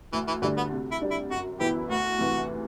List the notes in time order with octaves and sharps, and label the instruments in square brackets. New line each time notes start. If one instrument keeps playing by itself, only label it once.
[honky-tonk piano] D2 [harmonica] E3
[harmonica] E3
[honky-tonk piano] D3 G3 D4 [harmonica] E3
[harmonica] B3
[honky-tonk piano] C3
[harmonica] E4
[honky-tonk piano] G3 D4
[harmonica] E4
[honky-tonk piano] F#2 [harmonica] F#4
[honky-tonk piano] E3 B3 E4 [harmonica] G4
[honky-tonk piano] D2 [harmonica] F#4
[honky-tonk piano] C3 E3